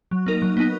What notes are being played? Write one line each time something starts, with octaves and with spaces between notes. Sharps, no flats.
F#3
A#3 D#4 A#4
F#3
B3 D#4